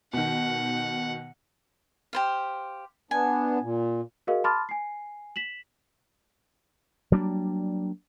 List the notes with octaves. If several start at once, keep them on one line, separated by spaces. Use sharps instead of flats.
B2 D#3 F#5
G4 C5 F5
B3 D4 G#5
A#2
F#4 G#4 A#4 D#5 F5
A5 B5 C6 D6 F6 A6
G#5 C7
B6 E7 F#7
F#3 G3 A#3 D4